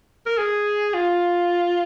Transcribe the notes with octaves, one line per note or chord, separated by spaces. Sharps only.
A#4
G#4
F4